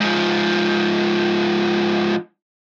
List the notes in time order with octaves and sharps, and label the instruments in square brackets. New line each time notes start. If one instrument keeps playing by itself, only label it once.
[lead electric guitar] G#2 F3